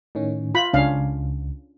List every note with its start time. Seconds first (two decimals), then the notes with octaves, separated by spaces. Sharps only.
0.15 A2 D#3 C#4
0.55 F4 B5
0.73 C#2 C#4 D4 F5